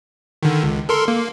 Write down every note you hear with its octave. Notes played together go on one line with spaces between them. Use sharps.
D3 D#3
C#2
A4 A#4 C6
A#3